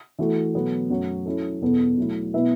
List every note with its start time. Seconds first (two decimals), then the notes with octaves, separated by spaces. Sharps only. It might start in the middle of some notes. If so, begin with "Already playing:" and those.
0.18 E3 A3 F#4 A4
0.54 B2 F#3 B3 A4
0.90 F#2 F#3 A3 F#4 C#5
1.26 F#3 C#4 E4 A4
1.61 E2 B2 B3 A4
1.98 F#3 A3 E4
2.34 B2 B3 E4 B4 E5